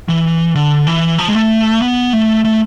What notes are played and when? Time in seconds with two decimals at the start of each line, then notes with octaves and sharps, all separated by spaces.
0.08 E3
0.55 D3
0.87 E3
1.18 F3
1.28 G#3
1.35 A3
1.82 B3
2.13 A3
2.45 A3